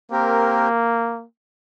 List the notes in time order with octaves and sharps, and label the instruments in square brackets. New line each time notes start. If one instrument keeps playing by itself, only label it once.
[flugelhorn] A#3 [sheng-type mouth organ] C4 G4 A#4